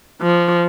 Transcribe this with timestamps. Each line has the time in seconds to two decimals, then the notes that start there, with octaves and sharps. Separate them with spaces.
0.21 F3